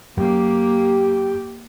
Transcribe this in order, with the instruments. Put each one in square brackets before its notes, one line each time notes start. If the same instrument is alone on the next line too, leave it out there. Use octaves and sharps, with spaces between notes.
[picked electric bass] F#2 [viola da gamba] A#3 [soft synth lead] G4